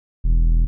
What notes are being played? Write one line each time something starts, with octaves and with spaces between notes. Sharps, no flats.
E1